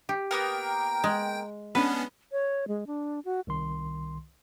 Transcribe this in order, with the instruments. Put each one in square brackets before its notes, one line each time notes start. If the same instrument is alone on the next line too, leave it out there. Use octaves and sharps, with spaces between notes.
[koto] G4
[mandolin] A#3 B3 A#4 [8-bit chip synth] G5
[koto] G#3
[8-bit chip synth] B3 C#4 D4 [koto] B4
[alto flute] C#5
G#3
D4
F#4
[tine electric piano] C2 D#3 C6